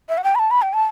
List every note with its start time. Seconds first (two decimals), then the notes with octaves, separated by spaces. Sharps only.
0.09 E5
0.18 F#5
0.24 G5
0.35 B5
0.39 A5
0.51 B5
0.62 G5
0.73 A5